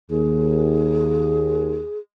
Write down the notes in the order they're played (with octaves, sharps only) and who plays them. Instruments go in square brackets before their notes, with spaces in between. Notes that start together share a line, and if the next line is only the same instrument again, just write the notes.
[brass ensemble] D#2 [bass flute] G#4